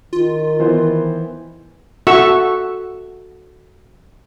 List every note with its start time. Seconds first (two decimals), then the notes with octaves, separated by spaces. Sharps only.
0.13 D#3 F4
0.60 E3 B3 C5
2.07 F#4 A4 E5 C#6 E6